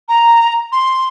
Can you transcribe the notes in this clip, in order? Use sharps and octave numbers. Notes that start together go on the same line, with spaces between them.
A#5
C6